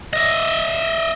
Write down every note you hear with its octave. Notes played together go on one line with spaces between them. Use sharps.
D#5 E5